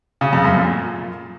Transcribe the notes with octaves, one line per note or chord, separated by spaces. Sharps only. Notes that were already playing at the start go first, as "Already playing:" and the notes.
C#3
F2
F#2
A#2